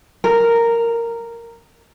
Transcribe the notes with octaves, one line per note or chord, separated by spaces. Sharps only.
A#4